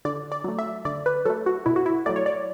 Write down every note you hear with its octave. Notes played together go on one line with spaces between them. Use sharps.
D3 D5
D5
F#3 A3
E5
D3 D5
B4
F#3 A3 A4
F#4
B2 E4
F#4
E4
F#3 A3 D5
C#5
D5